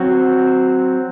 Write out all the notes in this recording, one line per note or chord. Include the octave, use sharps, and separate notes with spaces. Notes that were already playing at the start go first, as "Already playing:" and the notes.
Already playing: F#3 C4 F#4